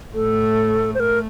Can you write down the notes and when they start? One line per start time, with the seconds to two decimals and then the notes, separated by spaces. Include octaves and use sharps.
0.14 A2 A3 A4
0.94 C5
0.99 A3 A#4